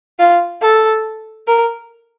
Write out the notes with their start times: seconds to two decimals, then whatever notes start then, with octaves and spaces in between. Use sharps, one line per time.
0.19 F4
0.62 A4
1.47 A#4